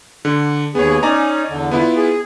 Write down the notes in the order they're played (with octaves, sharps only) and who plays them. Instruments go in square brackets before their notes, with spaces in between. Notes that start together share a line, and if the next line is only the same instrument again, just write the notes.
[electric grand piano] D3
[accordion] D#2 G#4 [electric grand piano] B3 C#5
[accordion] C#4 D#4 [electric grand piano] D5 G#5 A#5
[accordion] E2 D3
[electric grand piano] B3 E4 F4
[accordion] G#4